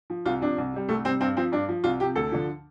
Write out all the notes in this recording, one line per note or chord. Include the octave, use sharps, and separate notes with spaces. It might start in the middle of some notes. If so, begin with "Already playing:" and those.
F3
C2 F4
C3 F3 D4
C2
C3 G3
C2 A3
C3 G3 C4
G2 C4
F3 C4
G2 D4
F3
C2 F4
C3 F3 G4
D2 A4
D3 F3